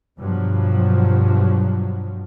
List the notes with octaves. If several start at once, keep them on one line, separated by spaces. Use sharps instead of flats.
G2 B2 F3 F#3